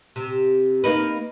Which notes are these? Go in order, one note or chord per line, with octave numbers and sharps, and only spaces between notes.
C3
A#3 D#4 B4